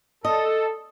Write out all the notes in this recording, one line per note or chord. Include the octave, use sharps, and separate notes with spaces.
A4 D#5